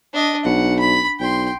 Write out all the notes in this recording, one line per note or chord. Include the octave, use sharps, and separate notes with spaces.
D4 D#5
B1 F#5
B5
B1 G5 C6